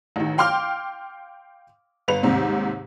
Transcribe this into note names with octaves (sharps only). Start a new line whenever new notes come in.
A1 D#3
F5 G5 C6 D6 F6
G1 B4 F7
D#2 G#2 C3 G3 C4